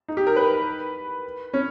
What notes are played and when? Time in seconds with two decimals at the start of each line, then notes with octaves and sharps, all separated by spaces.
0.08 D#4
0.17 G4
0.27 A#4
0.36 B4
1.54 C#4